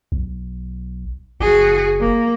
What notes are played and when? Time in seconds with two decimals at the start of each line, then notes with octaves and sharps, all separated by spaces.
0.12 B1
1.40 F#1 F#4 G#4
2.00 A#3